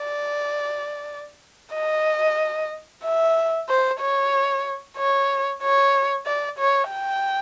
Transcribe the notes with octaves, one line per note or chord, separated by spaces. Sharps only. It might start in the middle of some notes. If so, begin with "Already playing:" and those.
Already playing: D5
D#5
E5
C5
C#5
C#5
C#5
D5
C#5
G5